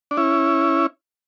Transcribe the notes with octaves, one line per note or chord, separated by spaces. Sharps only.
D4
C#4 E4